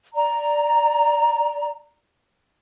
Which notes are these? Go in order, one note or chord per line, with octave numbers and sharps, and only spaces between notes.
D5 A#5